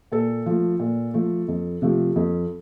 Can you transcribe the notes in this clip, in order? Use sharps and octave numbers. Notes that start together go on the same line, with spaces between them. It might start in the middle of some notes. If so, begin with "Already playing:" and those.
A#2 A4
F3 A3
A#2
F3 A3
F2
C3 F3 A3
F2